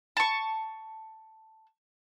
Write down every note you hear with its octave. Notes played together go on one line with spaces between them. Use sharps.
A5 C#6